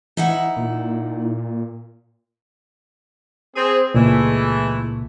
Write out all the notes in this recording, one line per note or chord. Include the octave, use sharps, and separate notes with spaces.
E3 D#4 E4 F#5
A#2
C4 G#4
C#2 A#2 E3 G#3 A3